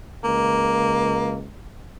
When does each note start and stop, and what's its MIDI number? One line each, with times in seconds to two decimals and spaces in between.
0.24 1.48 37
0.24 1.40 58